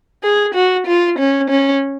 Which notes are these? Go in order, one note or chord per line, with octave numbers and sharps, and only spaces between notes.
G#4
F#4
F4
C#4
C#4